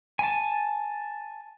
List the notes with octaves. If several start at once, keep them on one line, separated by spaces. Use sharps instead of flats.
G#5 A5